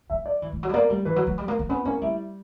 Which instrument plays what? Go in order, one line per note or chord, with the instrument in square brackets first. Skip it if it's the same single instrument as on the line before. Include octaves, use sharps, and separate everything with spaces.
[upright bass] F#3 [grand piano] E5
[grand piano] D5
[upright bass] E3
E3
F#3
G3
[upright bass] A#3 [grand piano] D5
[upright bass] G3
[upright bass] E3 [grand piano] B4
[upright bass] F#3
F#3
G3
A#3
A#3
[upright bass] B3 [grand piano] C#4
[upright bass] A#3 [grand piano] C#4
[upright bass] G3 [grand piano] E4